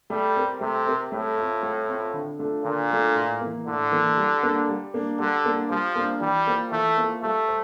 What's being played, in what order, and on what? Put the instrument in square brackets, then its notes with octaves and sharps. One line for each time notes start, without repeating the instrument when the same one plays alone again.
[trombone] G3 [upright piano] A3
[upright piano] C4 G4 A#4
[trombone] C3 [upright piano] A3
[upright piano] C4 G4 A#4
[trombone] A2 [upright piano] A3
[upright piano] C4 F4
A3
C4 F4
D3
A3 D4 F4 A4
[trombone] A#2 [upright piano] D3
[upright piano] A3 D4 F4 A4
A2
E3 A#3
[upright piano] A2 [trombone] D3
[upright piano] E3 A#3
G3
A#3 D4
G3
A#3 D4
[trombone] D3 [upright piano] G3
[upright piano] A#3 D4
[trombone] F3 [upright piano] G3
[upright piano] A#3 D4
[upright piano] E3 [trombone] G3
[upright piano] A#3 F4 C5
[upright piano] E3 [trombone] A3
[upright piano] A#3 F4 C5
[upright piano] G3 [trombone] A3
[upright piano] C5